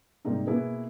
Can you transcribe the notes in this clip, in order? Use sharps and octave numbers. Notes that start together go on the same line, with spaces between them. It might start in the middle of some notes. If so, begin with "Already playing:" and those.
G#2 C3 G3 A#3 D#4
B2 A#3 E4 G#4 B4